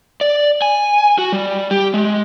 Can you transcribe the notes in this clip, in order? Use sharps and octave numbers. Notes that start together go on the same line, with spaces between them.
D5
G#5
F#4
G3
G4
G#3